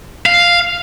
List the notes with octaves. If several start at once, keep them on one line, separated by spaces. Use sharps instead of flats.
F5